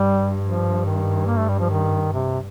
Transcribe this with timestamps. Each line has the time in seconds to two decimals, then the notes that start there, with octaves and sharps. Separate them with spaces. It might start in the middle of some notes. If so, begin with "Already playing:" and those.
Already playing: G2 G3
0.42 F3
0.85 D#3
1.26 A#3
1.37 A3
1.48 G3
1.59 F3
1.70 D#3
2.13 C3